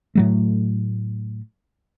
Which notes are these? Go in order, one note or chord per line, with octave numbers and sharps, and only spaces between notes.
A2 F#3 A3